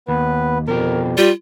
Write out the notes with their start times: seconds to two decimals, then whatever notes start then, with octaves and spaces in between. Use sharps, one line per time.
0.08 D#2 B3 B4
0.68 F2 B2 F3 G4 A#4
1.17 G3 F4